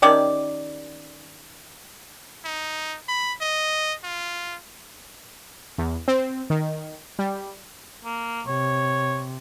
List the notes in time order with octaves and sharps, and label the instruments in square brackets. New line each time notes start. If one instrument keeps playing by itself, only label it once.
[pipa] D#3 C#4 G4 D5
[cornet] D#4
B5
D#5
F4
[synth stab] E2
C4
D#3
G3
[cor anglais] A#3
[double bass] C3 [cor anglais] C#5